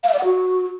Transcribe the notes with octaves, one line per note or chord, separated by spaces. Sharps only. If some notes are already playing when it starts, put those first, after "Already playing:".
F5
E5
D5
F#5
F#4